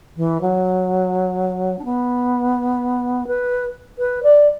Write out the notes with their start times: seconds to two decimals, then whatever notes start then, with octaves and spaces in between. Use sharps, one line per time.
0.17 E3
0.41 F#3
1.79 D4
1.85 B3
3.27 B4
3.99 B4
4.23 D5